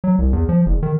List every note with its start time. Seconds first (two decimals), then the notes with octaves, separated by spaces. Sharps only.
0.04 F#3
0.18 C2
0.33 E2
0.49 F3
0.66 F#1
0.83 D#3